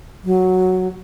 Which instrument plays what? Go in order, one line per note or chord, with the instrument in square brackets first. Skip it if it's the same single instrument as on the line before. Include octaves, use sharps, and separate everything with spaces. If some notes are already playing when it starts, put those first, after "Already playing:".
[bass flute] F#3